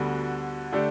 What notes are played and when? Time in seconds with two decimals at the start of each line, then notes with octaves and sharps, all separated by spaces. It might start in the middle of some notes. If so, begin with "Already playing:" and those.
Already playing: D2 D3 G3 B3 F#4
0.72 D3 A3 D4 G4